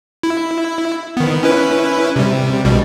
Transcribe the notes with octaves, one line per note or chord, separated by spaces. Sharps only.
E4
D#3 B3
C#4 E4 B4
C3 G3
A#1 B2 G3